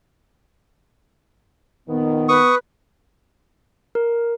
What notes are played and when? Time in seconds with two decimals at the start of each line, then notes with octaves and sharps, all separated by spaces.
1.88 F2 A#2 D#3 B3
2.29 B4 C#6 D#6
3.95 A#4